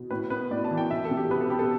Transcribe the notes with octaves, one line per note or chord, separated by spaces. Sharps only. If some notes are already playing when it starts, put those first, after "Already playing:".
Already playing: B2
A2 B4
B3 B4
A2 D5
A5
E3
G5
B2 E5
A4
B2
G4
B3 B4
A4
B3 G4
A4